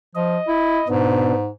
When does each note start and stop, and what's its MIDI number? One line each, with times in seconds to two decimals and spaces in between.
0.15 0.37 53
0.15 0.88 75
0.48 0.81 64
0.88 1.48 44
0.88 1.33 47
0.88 1.33 59
0.88 1.33 62